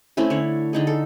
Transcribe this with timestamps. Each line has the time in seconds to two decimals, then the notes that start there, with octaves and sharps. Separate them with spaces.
0.17 A3 C4 C#4 E4
0.30 D3 C#5
0.73 D3 D#4 G#4
0.87 A4